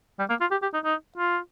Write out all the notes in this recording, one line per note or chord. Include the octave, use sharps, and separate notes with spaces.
G3
A#3
F4
G4
G4
D#4
D#4
F4